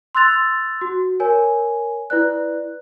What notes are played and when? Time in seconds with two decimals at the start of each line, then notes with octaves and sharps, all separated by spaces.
0.15 C6 E6 F#6 A6 F7
0.81 F#4
1.20 A#4 C#5 G#5
2.10 E4 B4 D5 F#6